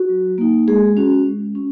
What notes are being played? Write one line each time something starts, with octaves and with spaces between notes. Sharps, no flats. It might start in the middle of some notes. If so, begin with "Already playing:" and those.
Already playing: F#4
F#3
A#3 D#4
G#3 G#4
C#4 F#4
G#3
C#4